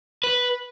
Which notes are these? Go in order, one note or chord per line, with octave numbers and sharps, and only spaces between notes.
B4